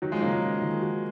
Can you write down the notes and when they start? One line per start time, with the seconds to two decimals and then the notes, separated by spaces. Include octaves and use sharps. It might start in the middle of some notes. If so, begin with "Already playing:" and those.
0.02 D#3 F#3 F#4
0.12 F3 G#3
0.21 C#3 F#3 A#3
0.31 F3 G#3
0.42 F4
0.62 D#3
0.81 F#4